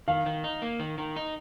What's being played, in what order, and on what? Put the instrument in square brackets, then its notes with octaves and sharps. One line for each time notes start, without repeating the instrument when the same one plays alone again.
[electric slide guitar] D#3 [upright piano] F5
[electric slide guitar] D#3
D#4
A#3
D#3
D#3
D#4